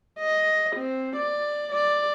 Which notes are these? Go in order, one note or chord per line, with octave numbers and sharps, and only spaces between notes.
D#5
C4
D5
D5